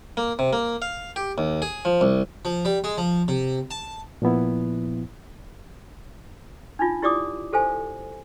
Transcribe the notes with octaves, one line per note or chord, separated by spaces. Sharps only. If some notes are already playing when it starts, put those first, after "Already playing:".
A#3
C3
A#3
F5
G4
D#2
G#4
F3
C2
F3
G3
G#3
F3
C3
A5
A#2 F3 B3 E4
D4 D#4 F4
E4 G4 D5 D6 D#6
G4 A4 C5 F5 G#5